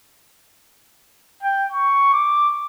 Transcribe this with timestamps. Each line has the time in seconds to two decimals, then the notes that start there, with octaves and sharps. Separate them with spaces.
1.43 G5
1.72 C#6
2.13 D6